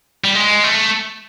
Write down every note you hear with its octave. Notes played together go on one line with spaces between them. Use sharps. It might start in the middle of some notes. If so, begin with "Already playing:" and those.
G3
G#3
A3